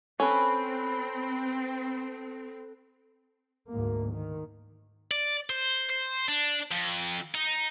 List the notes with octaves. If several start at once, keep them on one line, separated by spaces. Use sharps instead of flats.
C4 C#4 A4 B4
D2 G#2 A#3
D#3
D5
C5
C5
D4
F2
D#4